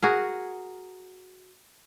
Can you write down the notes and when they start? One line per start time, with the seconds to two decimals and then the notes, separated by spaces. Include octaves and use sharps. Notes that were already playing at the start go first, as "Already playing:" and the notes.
0.02 F#4 G#4 A#4